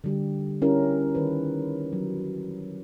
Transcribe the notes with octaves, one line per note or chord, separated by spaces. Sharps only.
D3 G3 G4
C#4 E4 G4 A#4
D#3 B4
F#3